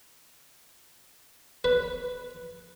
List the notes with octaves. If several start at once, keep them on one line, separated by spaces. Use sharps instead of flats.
B4